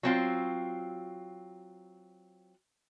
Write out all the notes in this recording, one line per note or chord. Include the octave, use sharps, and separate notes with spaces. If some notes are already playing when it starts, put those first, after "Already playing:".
F#3 C4 F4